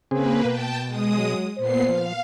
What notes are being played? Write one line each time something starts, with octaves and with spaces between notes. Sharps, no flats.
C#3 A#3 C4 G#4 B4
B2 G5 A5
G#3 D#6
F#3
A#2 B3 C5 C7
F3 F5